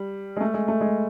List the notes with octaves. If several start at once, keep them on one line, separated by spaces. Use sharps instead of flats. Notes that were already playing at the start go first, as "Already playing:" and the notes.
Already playing: G3
G#3
A3
G#3
A3
G#3